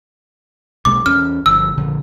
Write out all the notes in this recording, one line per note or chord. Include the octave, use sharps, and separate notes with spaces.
B1 G#3 A#3 D6
E2 C#4 F6
G1 F3 E6
A#1 D3 F3